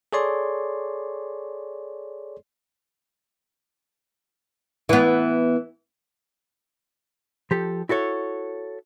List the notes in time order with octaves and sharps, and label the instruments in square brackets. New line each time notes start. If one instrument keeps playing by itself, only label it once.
[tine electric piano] G#4 A4 C#5 D5 C6
[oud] E3 B3
[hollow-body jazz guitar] F3 G4 A4
E4 F#4 A4 C#5